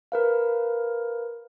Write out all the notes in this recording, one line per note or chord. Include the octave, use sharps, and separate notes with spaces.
A#4 B4 F5